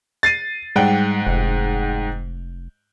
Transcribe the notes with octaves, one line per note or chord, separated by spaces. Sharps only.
A6 C7 D#7
G#2 G3 F#5 G5
F1